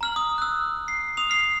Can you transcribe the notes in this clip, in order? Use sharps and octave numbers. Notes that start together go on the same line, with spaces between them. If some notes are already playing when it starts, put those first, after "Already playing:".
A#5 F6 F#7
D#6
E6 F#6
C7
D#6 F7
F6 C7